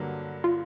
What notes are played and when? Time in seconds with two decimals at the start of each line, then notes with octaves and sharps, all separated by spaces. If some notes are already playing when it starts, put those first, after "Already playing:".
Already playing: G2 D3 F#3 A#3
0.44 F4